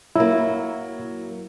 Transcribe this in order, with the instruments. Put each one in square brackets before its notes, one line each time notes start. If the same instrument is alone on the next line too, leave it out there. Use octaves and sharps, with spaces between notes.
[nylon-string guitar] F#3 A#3 [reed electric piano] E4